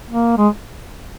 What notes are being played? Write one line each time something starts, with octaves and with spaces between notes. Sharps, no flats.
A#3
G#3